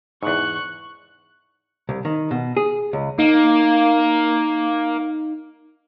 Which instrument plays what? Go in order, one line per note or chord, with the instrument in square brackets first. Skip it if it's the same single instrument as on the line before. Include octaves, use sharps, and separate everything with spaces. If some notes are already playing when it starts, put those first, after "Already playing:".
[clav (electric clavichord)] E2 G#2 [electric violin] C#6 F#6
[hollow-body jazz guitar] C2
D#3
B2
G#4
C#2
[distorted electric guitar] A#3 [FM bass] D#4